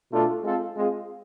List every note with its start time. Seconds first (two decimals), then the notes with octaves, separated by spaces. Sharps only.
0.12 B2 A3 D4 F4 A4
0.44 G#3 C4 F4 A4
0.75 G#3 C4 F4 G#4